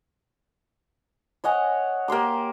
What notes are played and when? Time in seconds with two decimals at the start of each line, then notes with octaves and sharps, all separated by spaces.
1.44 C#5 D#5 F#5 G#5
2.08 A#3 G4 C6 D6